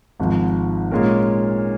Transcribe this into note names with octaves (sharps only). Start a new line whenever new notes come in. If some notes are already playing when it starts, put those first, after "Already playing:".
G#1 G#2 F3
A#2 G#3 C#4 A#4